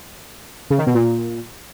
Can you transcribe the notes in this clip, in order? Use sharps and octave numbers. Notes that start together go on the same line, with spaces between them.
C#3
D#3
B2
A#2